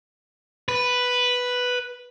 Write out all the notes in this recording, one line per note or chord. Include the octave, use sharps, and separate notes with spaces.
B4